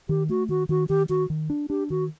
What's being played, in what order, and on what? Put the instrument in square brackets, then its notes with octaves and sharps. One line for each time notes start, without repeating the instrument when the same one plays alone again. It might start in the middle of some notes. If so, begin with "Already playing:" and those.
[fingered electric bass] D#3 [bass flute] G4
[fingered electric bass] A3 [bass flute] F#4
[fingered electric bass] D#3 [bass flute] F#4
[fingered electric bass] D#3 [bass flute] F#4
[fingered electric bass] D#3 [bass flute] G4
[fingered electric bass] D#3 [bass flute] F#4
[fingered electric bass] D#3
D4
[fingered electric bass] D4 [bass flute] G4
[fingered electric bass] D#3 [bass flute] F#4